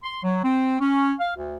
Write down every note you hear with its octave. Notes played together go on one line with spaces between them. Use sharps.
C6
F#3
C4
C#4
F5
D2